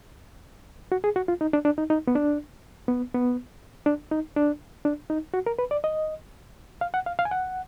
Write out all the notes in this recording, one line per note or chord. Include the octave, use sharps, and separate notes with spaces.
F#4
G#4
F#4
F4
D#4
D4
D4
D#4
D#4
B3
D4
B3
B3
D4
D#4
D4
D4
D#4
F#4
A#4
B4
D5
D#5
F5
F#5
F5
F5
G#5
F#5